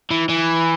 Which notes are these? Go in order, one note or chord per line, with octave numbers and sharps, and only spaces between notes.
E3
E3